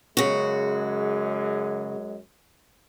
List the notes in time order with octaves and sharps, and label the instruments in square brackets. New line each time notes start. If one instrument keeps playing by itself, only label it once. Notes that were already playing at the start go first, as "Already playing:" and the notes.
[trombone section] F#2 G#3 [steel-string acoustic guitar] C#3 F#4